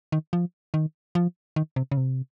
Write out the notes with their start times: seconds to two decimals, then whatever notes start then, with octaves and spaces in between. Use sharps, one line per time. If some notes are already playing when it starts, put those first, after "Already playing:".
0.12 D#3
0.33 F3
0.74 D#3
1.15 F3
1.56 D#3
1.76 C3
1.91 C#3
1.97 C3